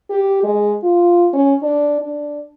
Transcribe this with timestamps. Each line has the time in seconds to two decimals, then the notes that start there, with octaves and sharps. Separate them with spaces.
0.10 G4
0.44 G#3
0.83 F4
1.33 C#4
1.63 D4
2.01 D4